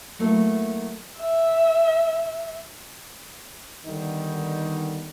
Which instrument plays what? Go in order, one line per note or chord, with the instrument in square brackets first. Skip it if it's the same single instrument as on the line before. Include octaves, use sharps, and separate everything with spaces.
[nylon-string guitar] F#3 A3 A#3 E4 B4
[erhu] E5
[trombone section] D3 D#3 G3 B3 D#4